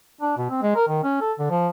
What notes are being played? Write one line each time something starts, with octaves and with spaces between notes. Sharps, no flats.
D4
B2
C4
G#3
A#4
D#3
C#4
A4
D3
F3